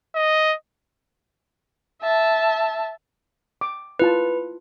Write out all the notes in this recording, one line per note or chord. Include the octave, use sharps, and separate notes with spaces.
D#5
E5 A5
D6
E4 F4 B4 A5